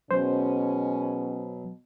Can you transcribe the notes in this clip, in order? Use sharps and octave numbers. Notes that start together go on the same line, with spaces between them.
B2 D#3 F#3 G#3 C#4 C5